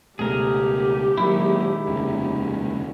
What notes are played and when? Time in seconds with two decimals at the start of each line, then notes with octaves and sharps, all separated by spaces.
0.19 C#2 B2 A3 G4 G#4 A#4
1.17 A#2 D#3 F#3 G#3 A#3 E4
1.87 F1 D#2 C#3